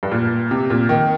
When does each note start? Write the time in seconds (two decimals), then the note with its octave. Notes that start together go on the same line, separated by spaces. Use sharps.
0.03 G2
0.12 A#2
0.51 C3
0.70 A#2
0.89 D#3